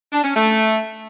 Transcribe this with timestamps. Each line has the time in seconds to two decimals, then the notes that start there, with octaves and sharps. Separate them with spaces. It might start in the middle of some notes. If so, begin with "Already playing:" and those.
0.12 D4
0.24 C#4
0.35 A3